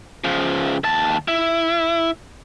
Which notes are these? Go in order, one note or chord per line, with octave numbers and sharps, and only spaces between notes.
C#3 F3
D#2 A5
E4